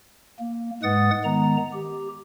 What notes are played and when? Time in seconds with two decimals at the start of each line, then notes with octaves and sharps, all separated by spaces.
0.39 A#3
0.83 G#2 G#3 B4 F#5 D#6 A6
1.24 D#3 G#3 B3 A#5
1.73 G4